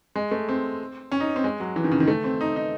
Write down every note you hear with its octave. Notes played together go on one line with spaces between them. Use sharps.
G#3
A3
C4
C#4
D#4
C4
G#3
F#3
E3
D#3
C#3
D#3
A3
C4
D#4
D#4